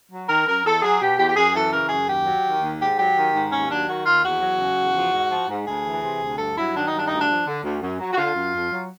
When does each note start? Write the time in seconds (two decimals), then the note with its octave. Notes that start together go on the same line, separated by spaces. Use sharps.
0.11 F#3
0.27 D#3 A#4
0.45 F#2 A#4
0.63 E2 A4
0.81 F#3 G#4
1.00 B2 G4
1.17 E2 G4
1.28 G4
1.35 F#2 G#4
1.53 E3 A4
1.71 C#3 A#4
1.89 F#2 G#4
2.07 D#2 G4
2.25 F#3
2.44 D#3
2.61 D#2
2.78 G#2 G4
2.97 F#3 G4
3.16 D#3
3.33 G#2
3.51 D#2 C#4
3.69 F#3 D4
3.87 D#3 F#4
4.04 D#2 F4
4.23 E2 F#4
4.40 F#3
4.58 C#3
4.76 E2
4.94 F3
5.12 G#2
5.30 F3
5.48 G#2
5.66 D2 G#4
5.84 E3
6.02 C3
6.20 D2
6.37 G2 A4
6.56 F#3 E4
6.74 D#3 D4
6.85 D#4
6.92 G2 D4
7.07 D2 D#4
7.19 D4
7.28 F3
7.46 D3
7.63 D2
7.81 F#2
7.99 F#3
8.12 F#4
8.17 D3 F4
8.34 F#2
8.54 F2
8.71 F#3